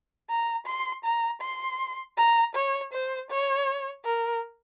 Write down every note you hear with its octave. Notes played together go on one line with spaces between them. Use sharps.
A#5
C6
A#5
C6
A#5
C#5
C5
C#5
A#4